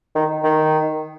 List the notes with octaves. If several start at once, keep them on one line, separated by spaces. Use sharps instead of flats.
D#3
D#3